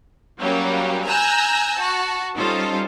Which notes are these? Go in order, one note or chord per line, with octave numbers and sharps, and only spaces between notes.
F#3 G3 A#3 C#4 G4
G#5 A#5 E6 F#6 G6 A#6
F#4 A5
G3 C#4 D#4 F4 A4 C5